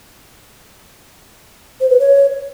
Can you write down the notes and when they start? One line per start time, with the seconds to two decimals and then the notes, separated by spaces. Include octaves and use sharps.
1.81 C5
1.90 B4
2.00 C#5